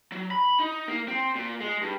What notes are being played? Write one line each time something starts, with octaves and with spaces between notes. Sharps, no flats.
F#3
B5
D#4
A#3
C4
A#2
G#3
G2